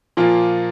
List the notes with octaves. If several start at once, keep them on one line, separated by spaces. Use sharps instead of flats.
A#2 F3 A#3 F4